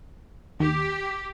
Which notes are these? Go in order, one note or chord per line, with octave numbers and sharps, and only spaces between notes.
D#2 G4